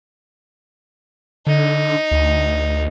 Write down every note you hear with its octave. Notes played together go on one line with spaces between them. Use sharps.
D3 D#4
D2